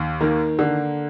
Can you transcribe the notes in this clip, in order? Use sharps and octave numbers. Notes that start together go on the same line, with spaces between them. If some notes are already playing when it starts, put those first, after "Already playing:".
Already playing: D#2
D#3 A#3
D3